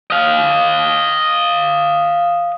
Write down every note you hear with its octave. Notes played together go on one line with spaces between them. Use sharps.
D#5 F5